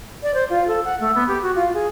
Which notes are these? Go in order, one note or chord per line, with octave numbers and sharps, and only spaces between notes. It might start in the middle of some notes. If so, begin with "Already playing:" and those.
D5
C5
F4
A4
F#5
A3
B3
G4
F#4
F4
G#4